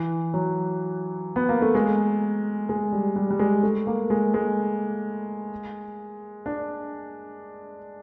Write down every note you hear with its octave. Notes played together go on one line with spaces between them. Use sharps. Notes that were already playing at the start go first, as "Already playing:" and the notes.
Already playing: E3
F#3
B3
A#3
A3
G#3
G#3
G3
G3
G3
G#3
A3
A#3
G#3
G#3
D4